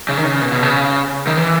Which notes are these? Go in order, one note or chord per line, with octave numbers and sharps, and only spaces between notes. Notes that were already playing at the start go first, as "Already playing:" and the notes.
C#3
D#3
C#3
B2
B2
C#3
D#3
E3